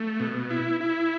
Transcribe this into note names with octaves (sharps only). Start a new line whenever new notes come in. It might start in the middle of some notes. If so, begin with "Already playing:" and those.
Already playing: A3
B2
E4
E4